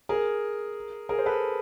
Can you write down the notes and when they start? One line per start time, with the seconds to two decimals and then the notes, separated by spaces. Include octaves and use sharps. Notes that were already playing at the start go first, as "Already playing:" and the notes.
0.09 G#4 A#4
1.09 G#4 A#4
1.18 C5
1.26 A4 B4